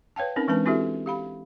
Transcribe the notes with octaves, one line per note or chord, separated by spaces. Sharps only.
B4 C#5 F5 G5 A5
C4 C#4 D#4 A#4
E3 G#3 C4 D4 B4 A5
C4 E4 F#4 G4 A4 E5
G4 F5 B5